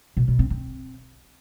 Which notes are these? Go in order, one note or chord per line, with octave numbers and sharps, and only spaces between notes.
B2
B2
C4
C4